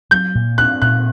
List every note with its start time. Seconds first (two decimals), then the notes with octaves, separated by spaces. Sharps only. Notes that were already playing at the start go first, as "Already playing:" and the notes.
0.11 F#3 G6
0.35 A#2
0.58 D4 F#6
0.82 A#2 F#6